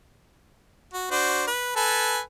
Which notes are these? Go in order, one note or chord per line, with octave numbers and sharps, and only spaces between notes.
F#4
D4 F#4 C5
B4
A4 B4 G#5